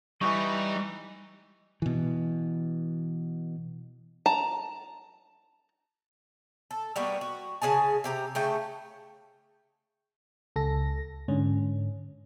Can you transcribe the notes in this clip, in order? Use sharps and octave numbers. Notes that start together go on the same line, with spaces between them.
E3 G3 D#4 D#5 C#6
B2 E3
A5 A#5
A4
G3 A#3 B3 F#4
F#4
C#3 G#4 G#5 A5
C3 G4 A#5
C#3 A3 G5
C#2 A4 A#6
G#2 D3 C#4